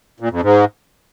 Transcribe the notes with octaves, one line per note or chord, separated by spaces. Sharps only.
A#2
F2
G#2